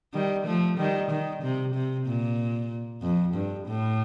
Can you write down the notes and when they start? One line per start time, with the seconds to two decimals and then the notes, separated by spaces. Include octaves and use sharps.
0.14 D#3 G3
0.46 F3 A3
0.78 D#3 G3
1.10 D#3
1.42 C3
1.74 C3
2.06 A#2
3.02 F2
3.34 G2
3.67 A2